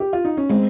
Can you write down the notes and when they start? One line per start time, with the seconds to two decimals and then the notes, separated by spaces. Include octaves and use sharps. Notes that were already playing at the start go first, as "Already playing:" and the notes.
0.00 G4
0.13 F4
0.25 D#4
0.37 C#4
0.49 G#3 C4